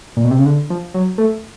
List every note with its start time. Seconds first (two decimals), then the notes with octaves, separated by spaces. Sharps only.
0.17 A#2
0.24 B2
0.31 C3
0.39 C#3
0.46 D3
0.70 F3
0.94 F#3
1.18 A3